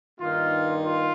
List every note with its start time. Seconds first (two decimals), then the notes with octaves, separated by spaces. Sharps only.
0.20 G2 D#3 A#3 D#4 F4
0.83 F4